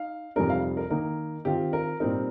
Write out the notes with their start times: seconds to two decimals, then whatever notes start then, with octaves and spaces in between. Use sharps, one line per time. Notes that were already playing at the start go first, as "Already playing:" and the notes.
Already playing: D#4 F5
0.36 F2 C3 G3 C4 D#4 A#4
0.50 F5
0.77 A#4
0.90 D#3 A#3 D#4 A#4
1.45 D#3 C4 F4 G4
1.73 A#4
2.00 A#2 G3 C4 D#4 A#4